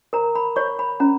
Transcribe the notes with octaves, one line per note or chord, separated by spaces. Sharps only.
A#4 A#5
B5
C#5 C#6
B5
C#4 A#5